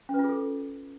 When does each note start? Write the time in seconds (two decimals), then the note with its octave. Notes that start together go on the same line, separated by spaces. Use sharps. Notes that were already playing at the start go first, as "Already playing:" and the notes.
0.09 C#4
0.14 B4
0.19 F4
0.24 G#4
0.29 A4